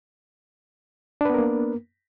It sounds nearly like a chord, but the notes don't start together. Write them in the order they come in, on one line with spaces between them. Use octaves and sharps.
D4 B4 B3 A#4 A#3